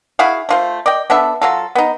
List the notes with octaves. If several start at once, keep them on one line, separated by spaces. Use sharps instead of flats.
E4 F#4 G#4 F5
A3 F4 C5
D5 D#5 G5
B3 D4 A4 E5
F#3 F4 A4
B3 D#4